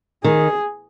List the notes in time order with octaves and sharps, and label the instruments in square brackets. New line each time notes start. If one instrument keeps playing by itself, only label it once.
[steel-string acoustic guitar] D#3 [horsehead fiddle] G#4